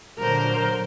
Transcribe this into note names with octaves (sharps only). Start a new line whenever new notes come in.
A#2 D3 F#3 A#4 C5